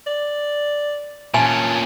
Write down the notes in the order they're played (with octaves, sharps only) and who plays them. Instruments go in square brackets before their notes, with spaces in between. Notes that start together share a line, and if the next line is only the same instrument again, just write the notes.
[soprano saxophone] D5
[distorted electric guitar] A#2 C#4 [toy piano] G#5 [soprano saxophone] A5